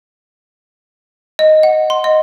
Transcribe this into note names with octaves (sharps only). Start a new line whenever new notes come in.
D#5
F#5
C6
D#5